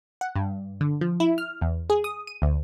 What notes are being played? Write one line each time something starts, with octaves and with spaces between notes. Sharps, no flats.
F#5
G2
D3
F3
E4
F6
E2
G#4
D#6
D#7
D2